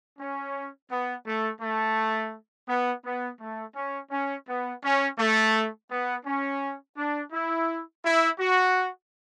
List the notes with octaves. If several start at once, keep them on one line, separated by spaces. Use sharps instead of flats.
C#4
B3
A3
A3
B3
B3
A3
C#4
C#4
B3
C#4
A3
B3
C#4
D4
E4
E4
F#4